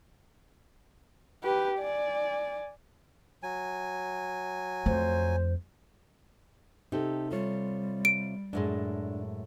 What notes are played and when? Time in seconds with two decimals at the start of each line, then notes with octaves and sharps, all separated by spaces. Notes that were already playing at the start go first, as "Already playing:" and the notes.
1.44 G4 B4
1.79 D5 G#5
3.43 F#3 G#5
4.86 F2 A3 C5
6.92 C3 D#4 G4 A4
7.31 G3 F4 C#5
8.05 D7
8.53 F#2 A2 G#3 D4